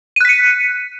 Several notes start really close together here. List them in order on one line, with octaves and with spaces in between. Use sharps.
D#7 F#6 B6 C#7